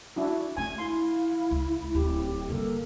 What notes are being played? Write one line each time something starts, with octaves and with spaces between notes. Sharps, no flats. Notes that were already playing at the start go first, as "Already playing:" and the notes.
D4 E4 F#4
E3 A3 D4 G#5
E4 F5 C6
C#2
D1 G4
G2 D3 A#3 A4